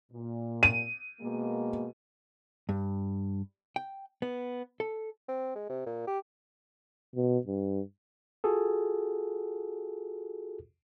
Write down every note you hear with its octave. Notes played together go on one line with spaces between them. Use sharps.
A#2
D#7
B2 G#3 A#3
G2
G5
B3
A4
C4
G#3
C3
A#2
G4
B2
G2
F4 F#4 G#4 A4